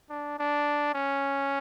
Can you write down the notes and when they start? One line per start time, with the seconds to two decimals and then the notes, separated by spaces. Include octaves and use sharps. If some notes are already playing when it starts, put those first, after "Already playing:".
0.10 D4
0.39 D4
0.94 C#4